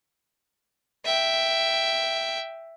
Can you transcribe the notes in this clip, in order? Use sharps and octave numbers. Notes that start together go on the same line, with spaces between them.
E5 G5